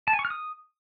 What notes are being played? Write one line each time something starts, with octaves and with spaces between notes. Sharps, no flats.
A5
G#5
C#6
F6
D#6